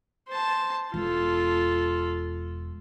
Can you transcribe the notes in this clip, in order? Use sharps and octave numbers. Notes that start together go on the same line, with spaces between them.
C5 A5
E1 F4 A4